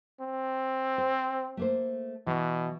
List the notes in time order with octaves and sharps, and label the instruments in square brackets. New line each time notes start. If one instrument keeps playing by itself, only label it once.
[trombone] C4
[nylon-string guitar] C5
A3 A#3 C5
[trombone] B2 [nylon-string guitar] E3